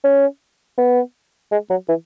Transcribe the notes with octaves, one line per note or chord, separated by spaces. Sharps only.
C#4
B3
G#3
F#3
E3